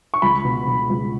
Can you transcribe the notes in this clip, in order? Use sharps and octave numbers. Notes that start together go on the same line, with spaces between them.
C#6
C#2 B5
B2
B2
C#2